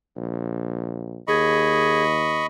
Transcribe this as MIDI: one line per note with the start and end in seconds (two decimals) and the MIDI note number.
0.16 1.19 34
1.28 2.45 39
1.28 2.03 68
1.28 2.46 75
1.28 2.46 83
1.28 2.46 85